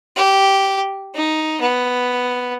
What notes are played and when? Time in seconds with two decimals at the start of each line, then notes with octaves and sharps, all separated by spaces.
0.17 G4
1.15 D#4
1.61 B3